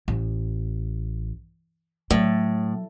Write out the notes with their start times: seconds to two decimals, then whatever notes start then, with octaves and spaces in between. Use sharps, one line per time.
0.08 A1
2.11 A2 F#3